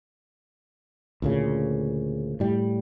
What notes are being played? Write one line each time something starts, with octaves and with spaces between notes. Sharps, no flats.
D2 A#2 C#3
A2 G3